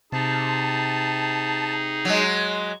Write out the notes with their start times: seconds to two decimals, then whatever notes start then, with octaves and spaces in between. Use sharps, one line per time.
0.12 C3 D#4 G#4 A5
2.05 F#3 G#3